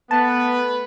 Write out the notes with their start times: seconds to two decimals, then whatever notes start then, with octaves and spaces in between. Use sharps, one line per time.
0.11 A3 B3 B4 A5